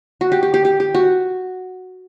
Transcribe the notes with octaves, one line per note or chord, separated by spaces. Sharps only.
F#4
G4
G4
G4
G4
G4
F#4